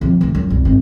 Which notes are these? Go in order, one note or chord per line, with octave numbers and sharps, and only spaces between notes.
C3 F3
E3 A3
F#2
E1 C2
G#1